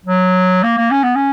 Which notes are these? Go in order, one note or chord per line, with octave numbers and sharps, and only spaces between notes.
F#3
A#3
A#3
C#4
B3
C#4